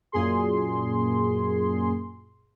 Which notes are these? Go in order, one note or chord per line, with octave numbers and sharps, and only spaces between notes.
F#2 A#2 G#4 C6